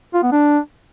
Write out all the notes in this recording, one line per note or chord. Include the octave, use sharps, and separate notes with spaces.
F4
B3
D4